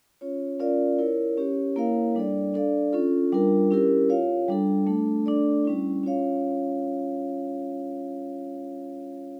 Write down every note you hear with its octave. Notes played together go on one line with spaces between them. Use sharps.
C#4 F4 C#5
C#4 F4 A#4 D5 F5
E4 A#4 C#5
C#4 G4 C#5
A#3 E4 A#4 C#5 F5
G3 D4 A4 D5
D4 A4 D5 F5
C#4 F4 A4
G3 D4 F4 A#4
C#4 E4 G4 A#4
F4 C#5 F5
G3 D4 A4
A3 D4 A4
A3 D4 A4 D5
G3 C#4 E4
C#4 F4 C#5 F5